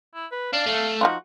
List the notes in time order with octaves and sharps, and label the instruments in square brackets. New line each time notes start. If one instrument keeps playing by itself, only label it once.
[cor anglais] E4
B4
[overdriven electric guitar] D4 [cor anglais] F5
[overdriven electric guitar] A3
[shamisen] F3 D#4 F4 [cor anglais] F#4